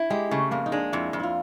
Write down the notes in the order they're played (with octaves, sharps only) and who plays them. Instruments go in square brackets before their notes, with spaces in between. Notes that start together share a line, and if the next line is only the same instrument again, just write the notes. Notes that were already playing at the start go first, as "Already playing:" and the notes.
Already playing: [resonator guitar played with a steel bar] E4
[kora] G#3 [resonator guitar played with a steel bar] G4
[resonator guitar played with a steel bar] C#3 [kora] A3
[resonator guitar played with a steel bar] F2 [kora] A#3
[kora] D#4
[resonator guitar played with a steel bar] G#3 [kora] D4
[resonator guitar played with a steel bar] F2 [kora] E4
[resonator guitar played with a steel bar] F2
[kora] E4 F4